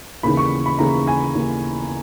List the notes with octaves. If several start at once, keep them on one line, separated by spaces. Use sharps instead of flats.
D#2 C#3 E3 B5
C#6
B5
D#2 C#3 E3 A#5
G#5
D#2 C#3 E3